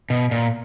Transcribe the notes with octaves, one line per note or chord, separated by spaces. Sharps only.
B2
A#2